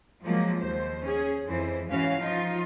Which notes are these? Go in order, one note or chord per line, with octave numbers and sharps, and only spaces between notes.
F3 F#3 G#3 A#3
D#2 C5
C#4 G#4
F2 E3 C5
G#2 E3 C#4 F#4 F5
F3 D#4 F4